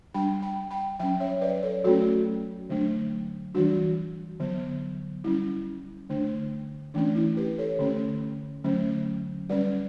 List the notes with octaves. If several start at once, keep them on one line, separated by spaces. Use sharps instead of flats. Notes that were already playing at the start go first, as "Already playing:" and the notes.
G3 D4 G5 B5
G5 B5
G5 B5
F#3 C#4 E5 G5
C#5 E5
B4 D5
A4 C#5
F#3 A3 C#4 F#4 A4
D3 F#3 A3 D4
E3 G3 D4 F#4
D3 F#3 B3
G3 C#4 E4
D3 A3 D4
E3 A3 C#4 D4
E4
G4 B4
A4 C#5
D3 A3 C#4
D3 F#3 A3 C#4
G3 C#4 B4 D5